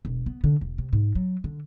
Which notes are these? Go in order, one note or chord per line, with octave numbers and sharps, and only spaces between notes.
E1
B3
D3
E1
C3
G#2
F#3
D3